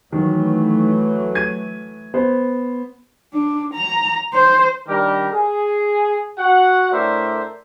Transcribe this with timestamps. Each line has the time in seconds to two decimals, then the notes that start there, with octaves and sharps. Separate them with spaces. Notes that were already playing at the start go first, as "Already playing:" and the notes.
0.12 D#3 E3 F#3 A3
1.35 G#6 D#7
2.14 B3 C5
3.33 D4
3.73 A#5
4.34 C5
4.88 D#3 G3 D4 G4 A#4
5.32 G#4
6.38 F#4 F#5
6.91 A2 D4 A#4 C5 D5 E5